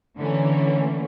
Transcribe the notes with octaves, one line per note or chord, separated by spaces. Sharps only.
D3 E3 A3 A#3 C#4